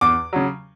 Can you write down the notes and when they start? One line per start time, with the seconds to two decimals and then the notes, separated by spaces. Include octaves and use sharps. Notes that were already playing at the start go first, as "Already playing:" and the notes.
0.01 E2 D6
0.33 C#3 F#3